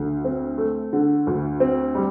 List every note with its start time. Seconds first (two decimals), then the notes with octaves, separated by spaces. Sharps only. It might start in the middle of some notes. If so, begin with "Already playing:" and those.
Already playing: D2 D3
0.25 C4
0.58 A3
0.93 D3
1.27 D2
1.60 C4
1.95 G3